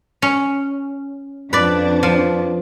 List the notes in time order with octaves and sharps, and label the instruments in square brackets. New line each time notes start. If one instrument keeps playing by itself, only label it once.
[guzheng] C#4
[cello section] F2 D4 [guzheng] B4 D5
[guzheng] F3